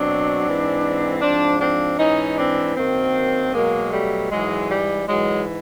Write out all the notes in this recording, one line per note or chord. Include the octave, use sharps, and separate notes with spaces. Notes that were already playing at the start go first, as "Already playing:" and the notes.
Already playing: B2 F#3 C4 D4
G#2 E3
G#2 F3 C4 D4
C4 D4
G#2 E3 C#4 D#4
C4 D4
F#2 D#3 F#3 A#3 C4
B2 F#3 G#3 A#3
G3 A3
G#2 E3 F#3 G#3
G3
G#2 E3 F#3 G#3